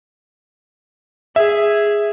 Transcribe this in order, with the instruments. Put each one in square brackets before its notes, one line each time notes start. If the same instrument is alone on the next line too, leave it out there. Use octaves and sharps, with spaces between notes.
[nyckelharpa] G#4 [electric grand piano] E5